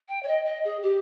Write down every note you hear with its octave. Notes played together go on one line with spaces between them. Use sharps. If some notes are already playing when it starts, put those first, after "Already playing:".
G5
C#5
D#5
D#5
G#4
G4